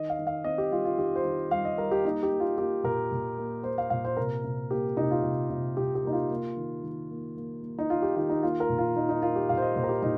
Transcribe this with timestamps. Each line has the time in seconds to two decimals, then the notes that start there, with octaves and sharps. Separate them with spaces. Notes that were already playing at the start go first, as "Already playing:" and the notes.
Already playing: D#3 D#5
0.10 F5
0.19 D#3
0.27 F5
0.44 C4 D#5
0.58 G4
0.71 G3 F4
0.85 F4
0.97 D#3 G4
1.16 C5
1.25 D#3
1.51 G3 F5
1.65 D#5
1.78 G3 A#4
1.92 G4
2.04 A#3 D#4
2.23 G4
2.31 A#3
2.40 F4
2.58 A#3 G4
2.84 A#2 A#4
3.11 A#2
3.38 A#3
3.63 A#3 C5
3.78 F5
3.90 A#2 F5
4.05 C5
4.17 C3 A#4
4.44 C3
4.71 A#3 G4
4.97 C3 D#4
5.11 F4
5.23 C3
5.50 C3
5.77 C3 G4
5.95 G4
6.04 A#3 D#4
6.12 F4
6.30 A#3
6.57 D#3
6.83 D#3
7.10 A#3
7.37 A#3
7.63 A#3
7.79 D#4
7.89 A#3 F4
8.02 G4
8.16 D#3 F4
8.30 D#4
8.43 A#3 F4
8.60 A#4
8.69 A#2
8.78 F4
8.96 A#3 D#4
9.09 D#4
9.22 A#3 F4
9.36 G4
9.49 A#2 F5
9.57 C5
9.62 D#5
9.76 A#2 C5
9.83 A#4
9.89 G4
10.02 A#2 D#4